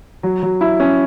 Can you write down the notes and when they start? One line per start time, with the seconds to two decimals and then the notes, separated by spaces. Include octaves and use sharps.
0.23 F#3
0.43 F#3
0.61 E4
0.80 C#4